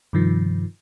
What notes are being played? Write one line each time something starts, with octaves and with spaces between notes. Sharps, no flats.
G2 C3 D#3 F3